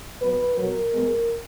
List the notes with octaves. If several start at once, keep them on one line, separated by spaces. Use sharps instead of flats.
B2 F#3 B4
B2 F#3 A#4
B2 G#3